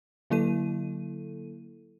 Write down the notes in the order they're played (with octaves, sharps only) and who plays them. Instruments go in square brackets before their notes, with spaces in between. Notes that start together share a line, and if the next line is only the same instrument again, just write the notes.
[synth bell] D3 F#3 A#3 E4 A4 D#7